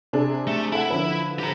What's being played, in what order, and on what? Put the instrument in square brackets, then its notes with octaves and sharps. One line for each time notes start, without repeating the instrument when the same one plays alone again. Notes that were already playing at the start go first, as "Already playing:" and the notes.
[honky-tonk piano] C3 D4 G#4
[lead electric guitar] A3
[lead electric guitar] E4 [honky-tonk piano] A4 F#5
[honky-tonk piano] D3 F3 B4
[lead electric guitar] G4 A#5